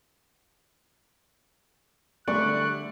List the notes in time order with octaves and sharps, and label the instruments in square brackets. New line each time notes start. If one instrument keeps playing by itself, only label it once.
[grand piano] D3 G3 A3 [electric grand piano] D5 [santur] C#6 [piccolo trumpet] F#6